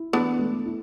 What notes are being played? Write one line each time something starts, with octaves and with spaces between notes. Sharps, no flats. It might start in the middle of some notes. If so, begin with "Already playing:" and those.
Already playing: E4
E3 B3 D4
A3
E4